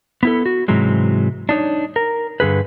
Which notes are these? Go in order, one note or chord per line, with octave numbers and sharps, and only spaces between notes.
B3 E4 A4
F#4
G#2 C3 E3 F#3 G#3
D4 D#4 C#5
A#4
G2 D3 G#4 B4